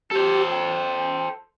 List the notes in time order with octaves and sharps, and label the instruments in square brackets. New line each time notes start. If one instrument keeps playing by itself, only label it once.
[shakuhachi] G4 [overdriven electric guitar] A4 C5
[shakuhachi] G5